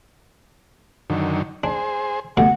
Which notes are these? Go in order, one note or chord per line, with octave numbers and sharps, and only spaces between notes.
F#2 D3 D#3
D4 G#4 C5
D2 G2 B2 F#5